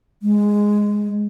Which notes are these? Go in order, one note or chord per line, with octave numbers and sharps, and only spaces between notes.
G#3